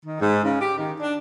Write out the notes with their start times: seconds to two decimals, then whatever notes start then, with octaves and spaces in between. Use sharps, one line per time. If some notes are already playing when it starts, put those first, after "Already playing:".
0.05 D#3
0.20 G#2
0.43 C#3
0.61 G4
0.77 D#3
1.00 D4